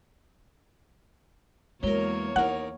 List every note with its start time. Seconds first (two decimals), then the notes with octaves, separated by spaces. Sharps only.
1.83 E2 F#3 G#3 A#3 A#4 C#5
2.36 D#2 E4 A#4 F#5